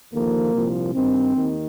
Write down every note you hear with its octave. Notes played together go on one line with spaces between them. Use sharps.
D#2 D3 F3 A#3
C2 A#2 F3
G2 D#3 C4
D#2 D#3